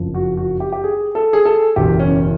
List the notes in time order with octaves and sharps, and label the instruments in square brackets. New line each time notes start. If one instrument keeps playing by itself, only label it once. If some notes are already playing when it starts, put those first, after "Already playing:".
Already playing: [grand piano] F#1 F2 C#3 F3
F#4
F#4
G4
G4
G#4
A4
G#4
A4
F#1 E2 B2 G4
C#4